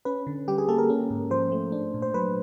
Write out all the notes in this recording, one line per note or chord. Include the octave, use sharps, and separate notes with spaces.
C#4 B4
D3
G3 G4
G#4
A#3 A4
A#4
C#4
G#2
F3 C5
A3
D4
A#2
C5
F#3 B4